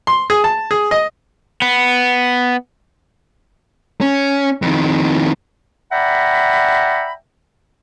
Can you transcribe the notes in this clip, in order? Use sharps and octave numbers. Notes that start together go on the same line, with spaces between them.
C6
G#4
A5
G#4
D#5
B3
C#4
F2 D#3
D5 E5 F#5 G5 A#5 B5